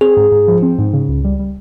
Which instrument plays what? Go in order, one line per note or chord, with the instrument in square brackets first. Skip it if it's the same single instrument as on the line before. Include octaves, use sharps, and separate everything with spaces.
[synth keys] C4 [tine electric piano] G#4
[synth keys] G#2
G#2
F3
C4
G#2
C#3
C#2
G3
G3